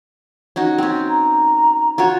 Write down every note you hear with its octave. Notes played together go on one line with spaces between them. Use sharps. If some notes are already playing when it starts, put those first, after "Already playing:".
C#4 D#4 F#4
C4 C#4
A#5
F4 F#4 C#5